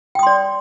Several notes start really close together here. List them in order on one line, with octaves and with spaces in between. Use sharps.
G5 D#6 C6 D5